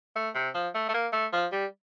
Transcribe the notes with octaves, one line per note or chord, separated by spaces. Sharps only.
A3
C3
F3
A3
A3
A#3
A3
F3
G3